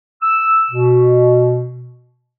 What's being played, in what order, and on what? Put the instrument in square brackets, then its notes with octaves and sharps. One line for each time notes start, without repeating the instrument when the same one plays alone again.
[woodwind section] E6
B2